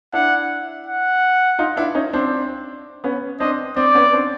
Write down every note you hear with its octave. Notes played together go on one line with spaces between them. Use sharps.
D4 E4 F#5
F#5
D#4 F4
D4 E4
C#4 D#4
C4 D4
B3 C#4
C4 D4 D#5
C4 D5
B3 C#4
C4 D4